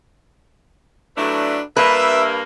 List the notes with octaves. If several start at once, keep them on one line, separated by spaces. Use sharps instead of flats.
A2 F#3 A3 D4 B4
G2 A#3 B4 E5